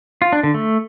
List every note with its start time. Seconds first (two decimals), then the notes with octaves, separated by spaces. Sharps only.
0.22 F4
0.33 D4
0.43 D3
0.54 A3